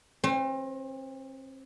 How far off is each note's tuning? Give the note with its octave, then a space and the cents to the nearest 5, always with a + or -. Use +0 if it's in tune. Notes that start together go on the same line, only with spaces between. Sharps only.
C4 +40 C5 -35